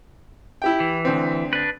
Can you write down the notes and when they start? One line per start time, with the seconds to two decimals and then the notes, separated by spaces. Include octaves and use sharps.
0.62 E4 G4 G5
0.80 E3
1.05 D2 C4
1.53 D4 B4